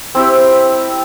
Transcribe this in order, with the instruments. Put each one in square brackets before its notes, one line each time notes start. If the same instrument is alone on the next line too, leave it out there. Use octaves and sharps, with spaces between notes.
[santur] C4 E4 G4